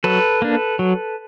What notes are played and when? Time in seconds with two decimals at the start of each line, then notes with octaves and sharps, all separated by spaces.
0.04 F#3 A4 B4
0.42 A#3 D4
0.79 F#3